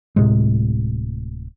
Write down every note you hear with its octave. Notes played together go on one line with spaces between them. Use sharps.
D1 A2 C3 G#3